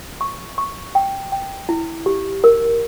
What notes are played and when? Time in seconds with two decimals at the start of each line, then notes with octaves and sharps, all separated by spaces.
0.21 C#6
0.58 C#6
0.95 G5
1.32 G5
1.69 E4
2.06 G4
2.44 A#4